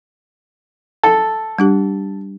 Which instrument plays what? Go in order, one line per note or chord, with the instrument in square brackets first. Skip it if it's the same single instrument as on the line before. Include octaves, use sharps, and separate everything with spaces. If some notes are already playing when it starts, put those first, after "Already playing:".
[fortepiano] A4
[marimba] G3 D4 G4